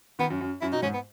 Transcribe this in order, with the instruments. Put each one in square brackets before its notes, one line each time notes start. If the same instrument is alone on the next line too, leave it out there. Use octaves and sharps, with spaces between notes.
[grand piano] D#3 [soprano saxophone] B3
[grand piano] F#2
F#2
[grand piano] F#2 [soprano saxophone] E4
[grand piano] B2 [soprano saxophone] D#4
[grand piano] G#2 [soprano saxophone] C#4
[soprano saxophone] B3